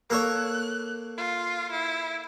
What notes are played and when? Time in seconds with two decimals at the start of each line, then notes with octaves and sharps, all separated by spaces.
0.10 A#3 A4 C#5 F#6
1.18 F4
1.71 E4